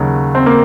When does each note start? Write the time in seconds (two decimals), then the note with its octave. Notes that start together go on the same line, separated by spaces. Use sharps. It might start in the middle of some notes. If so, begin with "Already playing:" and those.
Already playing: D#2 C#3 F#3
0.35 C4
0.46 A#3